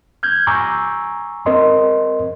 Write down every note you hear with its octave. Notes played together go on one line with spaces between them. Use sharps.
F6 G6 G#6
G#5 A#5 C#6 D6 E6
C4 A#4 D#5 C6